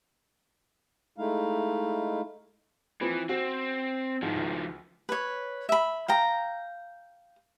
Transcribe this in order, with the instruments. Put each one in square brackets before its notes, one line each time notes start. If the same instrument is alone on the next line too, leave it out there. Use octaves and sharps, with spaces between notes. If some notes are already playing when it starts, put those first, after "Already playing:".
[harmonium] G#3 A3 D#4 E4 F5
[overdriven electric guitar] E3 [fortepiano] F3 C4 B4
[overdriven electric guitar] C4 [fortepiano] F#4
[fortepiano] G#2 [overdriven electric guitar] D#3 F3
[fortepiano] C#2
[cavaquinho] B4 C#5
E5 B5
F5 G5 A#5